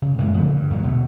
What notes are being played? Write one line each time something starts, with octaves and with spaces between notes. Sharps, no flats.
C#3
F#2 A2 G#3 A#3
C#3 F3 A3 B3
G2
E2 A#2 F#3 G#3
B2 D3 G#3 A3